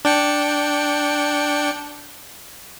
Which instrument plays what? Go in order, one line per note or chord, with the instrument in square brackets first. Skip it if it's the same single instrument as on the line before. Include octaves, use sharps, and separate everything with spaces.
[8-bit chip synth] D4 G5 C#7